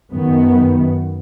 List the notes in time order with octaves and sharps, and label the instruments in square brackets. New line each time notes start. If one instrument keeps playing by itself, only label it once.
[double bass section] F#2 D#3 B3